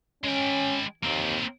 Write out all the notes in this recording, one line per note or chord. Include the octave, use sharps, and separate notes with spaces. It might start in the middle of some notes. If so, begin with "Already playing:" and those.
G#3 C#4 G5
D#2 A#3 C4